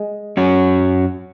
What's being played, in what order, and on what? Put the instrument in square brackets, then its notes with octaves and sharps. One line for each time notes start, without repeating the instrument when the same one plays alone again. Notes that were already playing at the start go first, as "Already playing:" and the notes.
Already playing: [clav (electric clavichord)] G#3
[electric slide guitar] F#2 F#3 C#4 F#4 C#5